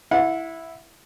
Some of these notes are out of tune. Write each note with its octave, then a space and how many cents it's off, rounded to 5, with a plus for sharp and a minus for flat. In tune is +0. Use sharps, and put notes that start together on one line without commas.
E4 +0 F#5 -30